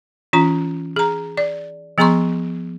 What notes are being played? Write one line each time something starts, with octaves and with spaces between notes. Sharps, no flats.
E3 C#4 F4 A#5
G#4 A#5
D5
F3 B3 G#4 A#5 C6 C#6